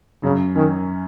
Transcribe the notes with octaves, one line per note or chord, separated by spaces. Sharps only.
F#2 C#3
D#3 C#4